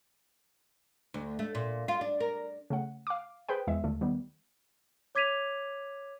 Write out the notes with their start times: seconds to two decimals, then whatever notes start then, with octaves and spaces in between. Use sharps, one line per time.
1.14 D2
1.39 A3
1.55 A#2
1.88 F4
2.01 D4
2.20 A#4
2.70 C#3 A3 F#5
3.07 F5 D6
3.49 G#4 B4 C5 G5
3.67 E2 G#3 E5
3.84 D#2 D3 A3
4.01 D#3 G3 B3
5.15 C#5 D6 G#6 B6 D#7 F7